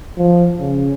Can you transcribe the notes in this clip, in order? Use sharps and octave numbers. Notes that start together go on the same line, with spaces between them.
F3
C#3